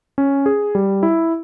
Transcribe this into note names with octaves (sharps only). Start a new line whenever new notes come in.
C#4
G#4
G3
E4